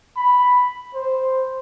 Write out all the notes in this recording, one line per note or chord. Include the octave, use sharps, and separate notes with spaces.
B5
C5